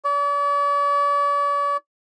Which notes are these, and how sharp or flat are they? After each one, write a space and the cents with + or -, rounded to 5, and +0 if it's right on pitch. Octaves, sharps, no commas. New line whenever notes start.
D5 -45